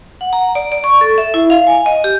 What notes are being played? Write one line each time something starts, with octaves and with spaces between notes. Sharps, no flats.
F#5
A#5
D5
D5
C#6
A4
E5
E4
F5
G#5
D#5
G4